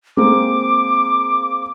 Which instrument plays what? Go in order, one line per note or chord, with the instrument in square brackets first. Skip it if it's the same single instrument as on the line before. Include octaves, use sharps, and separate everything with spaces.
[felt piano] G#3 A#3 C4 [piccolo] D6